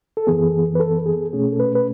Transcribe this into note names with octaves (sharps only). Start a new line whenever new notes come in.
A4
F#2 E3 B3 G#4
B4
A4
G#4
B2 A3 C#4 G#4
A4
B4
B4